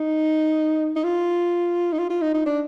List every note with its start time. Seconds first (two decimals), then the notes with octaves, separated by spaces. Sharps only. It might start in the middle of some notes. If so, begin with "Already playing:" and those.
Already playing: D#4
0.96 D#4
1.04 F4
1.92 D#4
1.98 F4
2.10 F4
2.22 D#4
2.34 D#4
2.46 D4